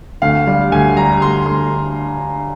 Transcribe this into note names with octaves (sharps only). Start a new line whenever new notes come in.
D2 F5
G3
D2 G#5
G3 A#5
D2 C6
D2 C6